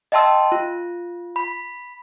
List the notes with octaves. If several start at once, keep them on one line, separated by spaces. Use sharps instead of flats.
D#5 E5 G5 A5 C6 E6
F4
B5